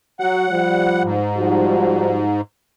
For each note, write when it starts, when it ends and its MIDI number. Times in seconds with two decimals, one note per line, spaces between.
0.20 0.45 54
0.20 1.03 78
0.51 1.14 53
0.51 1.14 55
1.04 2.41 44
1.37 2.26 53
1.37 2.26 55
1.37 2.26 66